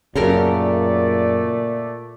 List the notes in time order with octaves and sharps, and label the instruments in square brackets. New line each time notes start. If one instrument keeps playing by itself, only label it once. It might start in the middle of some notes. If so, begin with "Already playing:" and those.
[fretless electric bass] F#2 C#3 [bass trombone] A#2 [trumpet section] A3 D5 [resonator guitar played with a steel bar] G4 A4 A#4